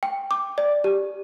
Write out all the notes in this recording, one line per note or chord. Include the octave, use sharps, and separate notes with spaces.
G5
D6
D5
G4